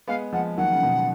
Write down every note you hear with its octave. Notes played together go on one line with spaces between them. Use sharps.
G#3 B3 F5
F3 G#3 F#5
D#3 F#3 F#5
C#3
B2 D#3